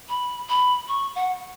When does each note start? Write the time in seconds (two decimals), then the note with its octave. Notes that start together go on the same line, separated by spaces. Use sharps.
0.09 B5
0.49 B5
0.88 C#6
1.15 F#5